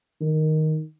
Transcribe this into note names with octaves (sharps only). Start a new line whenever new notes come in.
D#3